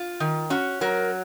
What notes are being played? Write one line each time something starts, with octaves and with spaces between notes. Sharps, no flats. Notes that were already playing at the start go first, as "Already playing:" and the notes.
Already playing: F4
D#3
C#4 F#4
F#3 A#4